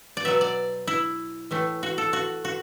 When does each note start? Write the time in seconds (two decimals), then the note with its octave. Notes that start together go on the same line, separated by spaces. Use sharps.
0.17 D5
0.25 B2 F#3 B3 E5
0.41 D5
0.87 E4
1.51 A2 E3 A3
1.83 F#4
1.98 A4
2.13 F#4
2.45 F#4